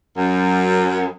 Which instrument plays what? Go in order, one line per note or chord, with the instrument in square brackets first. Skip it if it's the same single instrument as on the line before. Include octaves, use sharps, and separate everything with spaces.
[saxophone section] F#2